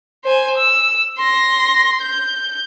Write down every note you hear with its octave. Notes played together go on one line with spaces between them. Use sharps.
C5 G#5
E6
C6 A#6
G6